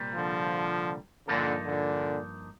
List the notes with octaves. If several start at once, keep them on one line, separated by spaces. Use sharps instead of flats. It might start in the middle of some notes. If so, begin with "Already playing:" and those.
Already playing: C2 A#2 G3
D3 F3
G2 A#2 D3 F3 A#3 D#4 A4
A#2 D3